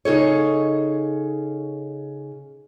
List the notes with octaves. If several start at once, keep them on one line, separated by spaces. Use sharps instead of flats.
C#3 D#4 A4 C#5